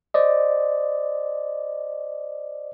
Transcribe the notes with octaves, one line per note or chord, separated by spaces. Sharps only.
C5 D5 D#5